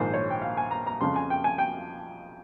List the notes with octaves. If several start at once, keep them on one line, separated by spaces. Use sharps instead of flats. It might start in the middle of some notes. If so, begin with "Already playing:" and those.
Already playing: A#1 G#2 D#3 C5
C#5
G5
F5
G#5
A#5
A#5
F2 C#3 F3 C6
G#5
G5
G#5
G5